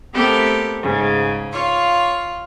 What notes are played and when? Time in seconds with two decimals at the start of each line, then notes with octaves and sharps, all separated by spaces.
0.13 A3 B3 C4 G4 A4 A#4
0.82 G#2 C#3
1.52 F4 C#5 F5